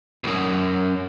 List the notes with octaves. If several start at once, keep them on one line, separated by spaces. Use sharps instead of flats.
B1 F#2